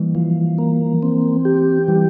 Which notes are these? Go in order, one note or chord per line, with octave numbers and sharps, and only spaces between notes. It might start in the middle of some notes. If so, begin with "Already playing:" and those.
Already playing: E3 G3 A#3
E3 F3
A#3
C4
G4
E3 G3